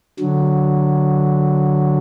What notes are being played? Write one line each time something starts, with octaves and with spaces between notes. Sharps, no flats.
D3 F#3